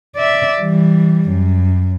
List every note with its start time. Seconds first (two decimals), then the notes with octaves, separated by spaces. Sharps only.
0.16 D5 E5
0.60 E3 G3
1.30 F#2